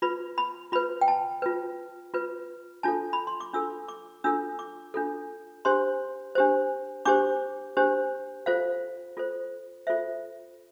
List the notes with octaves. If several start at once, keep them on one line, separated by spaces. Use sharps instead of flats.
F4 B4 B5
B5
F4 B4 B5
G5
A5
F4 B4
F4 B4
D4 F4 A4 A5
B5
C6
D6
D4 F4 A4 E6
D6
D4 F4 A4 E6
D6
D4 F4 A4
D4 G4 C5 C6
D4 G4 C5
D4 G4 C5 D6
D4 G4 C5
F4 A4 C5 F5
F4 A4 C5
F4 A4 C5 E5